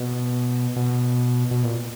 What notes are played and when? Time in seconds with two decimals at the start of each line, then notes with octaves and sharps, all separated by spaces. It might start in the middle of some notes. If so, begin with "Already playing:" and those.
Already playing: B2
0.76 B2
1.51 B2
1.64 A#2